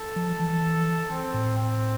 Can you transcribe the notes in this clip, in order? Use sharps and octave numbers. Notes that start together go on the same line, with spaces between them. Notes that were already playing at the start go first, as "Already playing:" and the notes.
Already playing: A4
F3
E3
C4
A2
C4